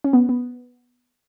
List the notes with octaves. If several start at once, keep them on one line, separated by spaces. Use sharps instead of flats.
C#4
B3
B3